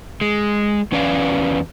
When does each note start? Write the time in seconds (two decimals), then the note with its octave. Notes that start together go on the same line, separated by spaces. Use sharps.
0.21 G#3
0.92 E2 C#4 B4 D5 F5